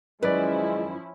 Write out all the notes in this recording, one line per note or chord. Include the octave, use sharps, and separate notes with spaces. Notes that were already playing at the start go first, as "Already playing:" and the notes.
F#2 D#3 F3 G#3 C#4 E4 B4 D5